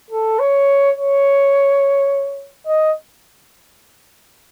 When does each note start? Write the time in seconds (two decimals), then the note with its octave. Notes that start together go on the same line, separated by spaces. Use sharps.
0.11 A4
0.40 C#5
0.97 C#5
2.67 D#5